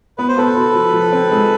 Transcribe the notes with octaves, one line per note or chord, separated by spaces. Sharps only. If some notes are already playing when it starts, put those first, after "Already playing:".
B3 B4
C5
B3 A4 B4
F#4
F3
F3
C4
G#3